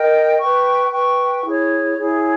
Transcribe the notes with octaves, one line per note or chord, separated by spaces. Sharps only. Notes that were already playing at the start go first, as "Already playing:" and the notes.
Already playing: A#4 D#5 G5
B4 G5 C#6
B4 G5 C#6
E4 G#4 C#5
E4 G#4 C#5